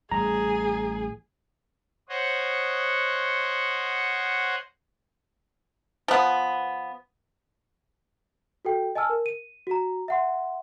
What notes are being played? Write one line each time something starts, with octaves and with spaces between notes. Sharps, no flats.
A1 G3 G#4 A#5
C5 C#5 D#5 F#5
F3 B3
F#4 A4 G5
D#5 G#5 A5 E6 F6
A#4
D#7
F#4 A#5
E5 F#5 C6